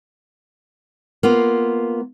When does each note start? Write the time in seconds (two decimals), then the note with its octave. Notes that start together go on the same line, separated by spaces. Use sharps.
1.23 A#3 B3 F4